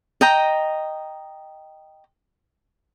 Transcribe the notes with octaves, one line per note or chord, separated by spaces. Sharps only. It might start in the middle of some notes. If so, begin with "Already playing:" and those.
D#5 G5 A#5